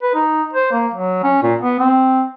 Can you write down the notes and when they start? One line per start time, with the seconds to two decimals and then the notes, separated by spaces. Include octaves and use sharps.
0.02 B4
0.14 D#4
0.53 C5
0.72 A#3
0.94 F#3
1.23 C#4
1.43 A#2
1.61 B3
1.79 C4